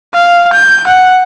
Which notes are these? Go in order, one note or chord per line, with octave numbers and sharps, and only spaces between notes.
F5
G6
F#5